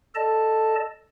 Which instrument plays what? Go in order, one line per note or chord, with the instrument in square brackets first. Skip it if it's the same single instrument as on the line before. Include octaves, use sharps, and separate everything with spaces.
[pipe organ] A4 D5 D#5 A5